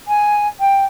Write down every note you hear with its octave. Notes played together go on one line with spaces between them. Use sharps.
G#5
G5